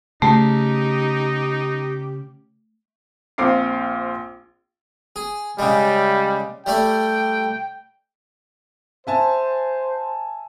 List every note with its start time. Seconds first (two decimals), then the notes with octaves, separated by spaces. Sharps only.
0.22 C#3 A3 D#4 G4
3.38 A#1 C4 F5 D6 C7
5.16 G#4
5.59 C#3 G3 G#3
6.66 G3 A3 D5 G5
9.07 C5 E5 G#5 A5